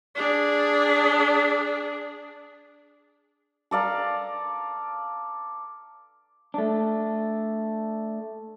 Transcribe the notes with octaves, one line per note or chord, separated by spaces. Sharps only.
D4 G#4
A4 D5 F5 A#5
A3 D4